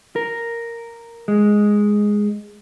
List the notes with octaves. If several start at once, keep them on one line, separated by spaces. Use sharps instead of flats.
A#4
G#3